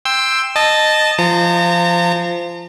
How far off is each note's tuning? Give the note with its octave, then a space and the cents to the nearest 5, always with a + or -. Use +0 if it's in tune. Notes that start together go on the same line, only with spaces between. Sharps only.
G5 +15 C6 +0 E6 +0
D#5 -15 A5 -5
F3 -15 A#5 -40